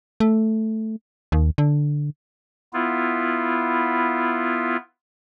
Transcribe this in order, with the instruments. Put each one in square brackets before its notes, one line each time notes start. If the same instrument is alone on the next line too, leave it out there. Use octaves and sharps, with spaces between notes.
[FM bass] A3
D#2
D3
[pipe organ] B3 E4 F4